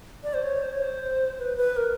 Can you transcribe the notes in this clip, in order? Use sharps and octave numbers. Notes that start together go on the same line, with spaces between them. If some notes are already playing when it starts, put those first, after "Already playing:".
D5
C5
C#5
C5
C#5
C5
B4
B4
A#4